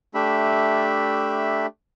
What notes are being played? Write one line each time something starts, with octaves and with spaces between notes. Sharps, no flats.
A3 D4 G4 E5 B5